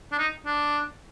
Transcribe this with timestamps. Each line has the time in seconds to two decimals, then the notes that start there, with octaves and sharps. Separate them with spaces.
0.12 D4
0.19 D#4
0.46 D4